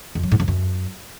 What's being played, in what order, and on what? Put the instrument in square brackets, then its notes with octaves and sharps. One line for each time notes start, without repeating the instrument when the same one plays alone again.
[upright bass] F2
F#3
G#2
F2
F#2